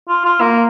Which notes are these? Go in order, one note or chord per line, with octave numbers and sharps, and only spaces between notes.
F4
F4
A#3